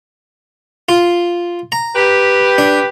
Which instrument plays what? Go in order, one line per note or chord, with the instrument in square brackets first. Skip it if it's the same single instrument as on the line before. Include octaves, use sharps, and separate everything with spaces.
[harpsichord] F4
A#5
[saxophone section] G4 B4
[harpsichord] D4